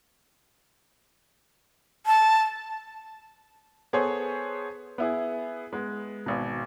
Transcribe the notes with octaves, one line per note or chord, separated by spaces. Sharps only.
A5
B3 G#4 A4 C5 C#5
B3 E4 G#4
G#3 B3
G#1 B2